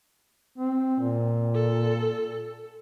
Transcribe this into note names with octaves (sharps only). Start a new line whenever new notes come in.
C4
A#2
A4